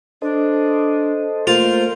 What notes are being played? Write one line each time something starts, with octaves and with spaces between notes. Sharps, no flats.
D4 A4 C5 D#5
A3 A#3 F4 A#4 C5